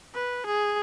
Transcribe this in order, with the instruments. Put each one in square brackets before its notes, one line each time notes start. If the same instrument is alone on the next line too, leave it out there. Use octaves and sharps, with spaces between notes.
[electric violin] B4
G#4